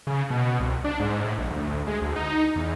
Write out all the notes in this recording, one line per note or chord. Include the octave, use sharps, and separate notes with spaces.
C#3
B2
C2
D4
G#2
A2
A#1
D2
G#3
D2
D#4
E2